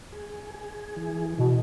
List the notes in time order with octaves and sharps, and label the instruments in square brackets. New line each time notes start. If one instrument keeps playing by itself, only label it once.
[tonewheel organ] G#4
G#4
E3
[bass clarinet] B2 [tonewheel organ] E3